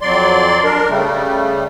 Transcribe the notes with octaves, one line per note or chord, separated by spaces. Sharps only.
F2 F#3 D5 C6
D4 A#4
C#3 G3 A3